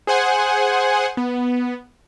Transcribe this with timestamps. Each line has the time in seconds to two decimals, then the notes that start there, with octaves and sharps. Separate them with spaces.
0.07 G#4 C5 F#5 G#5
1.17 B3